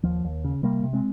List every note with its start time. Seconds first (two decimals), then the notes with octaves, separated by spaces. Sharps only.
0.03 D#2 F3
0.25 D#2
0.44 C#3
0.63 C3 G3 A#3
0.83 C3
0.93 G#3 C4